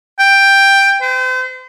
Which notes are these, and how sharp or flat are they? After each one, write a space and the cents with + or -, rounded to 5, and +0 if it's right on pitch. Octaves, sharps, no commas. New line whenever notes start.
G5 +5
C5 -40